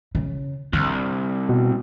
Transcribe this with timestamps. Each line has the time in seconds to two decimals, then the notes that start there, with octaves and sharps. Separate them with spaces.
0.15 C#3
0.73 C2 D3
1.49 B2